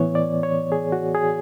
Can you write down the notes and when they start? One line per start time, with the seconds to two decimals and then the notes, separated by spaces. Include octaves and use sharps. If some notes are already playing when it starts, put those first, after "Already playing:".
Already playing: A2 E3 B3 C#5
0.15 D5
0.43 C#5
0.72 G#4
0.92 F#4
1.14 G#4